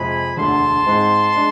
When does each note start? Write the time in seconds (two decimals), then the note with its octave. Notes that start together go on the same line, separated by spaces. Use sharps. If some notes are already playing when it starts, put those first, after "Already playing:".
Already playing: F2 C3 F3 G#3 C4 G#5 B5
0.36 E1 D2 D3 A5 C6
0.86 G#2 G#3 C4
1.36 G#3 D4